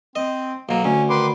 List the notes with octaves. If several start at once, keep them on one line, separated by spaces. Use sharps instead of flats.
C4 D#5
B1 F#3 A#3
D2 C#4
D#3 B4 C6 D6